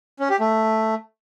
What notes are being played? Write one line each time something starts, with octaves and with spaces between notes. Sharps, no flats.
C#4
G4
A3